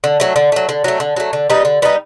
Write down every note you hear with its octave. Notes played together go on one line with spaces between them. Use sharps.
D3
F#3 A3
D3
F#3 A3
D3
F#3 A3
D3
F#3 A3
D3
G3 B3 D#4
D3
G3 B3 D#4